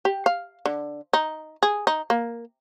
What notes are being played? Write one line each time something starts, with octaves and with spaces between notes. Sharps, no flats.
G4
F5
D3
D#4
G#4
D#4
A#3